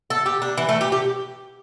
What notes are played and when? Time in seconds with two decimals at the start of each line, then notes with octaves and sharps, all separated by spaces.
0.10 A4
0.26 G4
0.42 D4
0.58 E3
0.69 A3
0.81 G4
0.92 G4